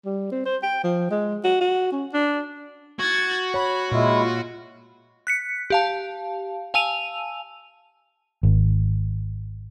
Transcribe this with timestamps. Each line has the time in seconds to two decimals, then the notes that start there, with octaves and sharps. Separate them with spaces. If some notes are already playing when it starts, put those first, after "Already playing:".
0.06 G3
0.32 C4
0.46 C5
0.63 G5
0.84 F3
1.11 G#3
1.44 F#4
1.61 F#4
1.92 C#4
2.13 D4
3.00 F#4 G#6 A6
3.54 C#5 B5
3.92 A#2 G#3 E4 F4
5.27 F#6 B6 C#7
5.70 G4 F5 A5
6.74 F5 G#5 A5 E6 D#7 F7
8.43 G#1